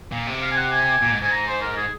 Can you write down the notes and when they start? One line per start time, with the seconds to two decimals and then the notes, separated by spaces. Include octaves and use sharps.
0.12 A#2
0.27 C3
0.42 F5
0.51 G#5
0.57 F#5
0.72 G#5
1.02 A#2
1.12 G#2
1.22 G#2 G#5
1.31 A#5
1.47 C5
1.62 A#4
1.77 G#4